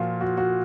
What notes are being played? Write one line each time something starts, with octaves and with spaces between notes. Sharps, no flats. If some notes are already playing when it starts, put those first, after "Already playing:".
Already playing: A#2 F3 F4 F#4
F#4
F#4